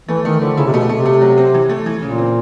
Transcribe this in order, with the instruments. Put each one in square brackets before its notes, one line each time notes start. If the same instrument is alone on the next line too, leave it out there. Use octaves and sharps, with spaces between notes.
[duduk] E3 [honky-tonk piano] A3
[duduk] D#3 [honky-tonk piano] A3
[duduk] D3 [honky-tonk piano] F3
[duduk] C#3 [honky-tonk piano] E4
[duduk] C3
[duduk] B2 [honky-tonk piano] A3
[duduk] C3 [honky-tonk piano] A3
[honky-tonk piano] A3
F#3
C4
E3
A3
E3
[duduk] A#2 [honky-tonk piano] C#3
[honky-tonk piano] C4